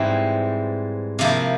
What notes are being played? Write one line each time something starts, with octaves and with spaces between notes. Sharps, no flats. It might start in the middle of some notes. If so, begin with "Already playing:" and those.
Already playing: G#2 E3 G3 C4 E4
C3 F3 A#3 E4